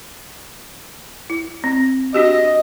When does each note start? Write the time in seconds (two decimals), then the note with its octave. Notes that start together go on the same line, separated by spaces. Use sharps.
1.30 E4
1.64 C4
2.14 D4 F#4 G4 D#5